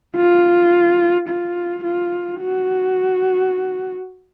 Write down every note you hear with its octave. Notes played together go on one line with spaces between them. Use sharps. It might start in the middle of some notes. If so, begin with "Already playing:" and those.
F4
F4
F4
F#4